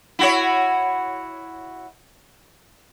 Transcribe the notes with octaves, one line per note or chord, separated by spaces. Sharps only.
E4 F#4 C#5